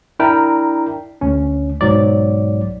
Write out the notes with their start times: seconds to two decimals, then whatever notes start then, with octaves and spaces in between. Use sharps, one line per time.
0.19 D4 E4 A#4 G5 A#5
1.21 D2 C#4
1.81 B1 G#2 F#3 D5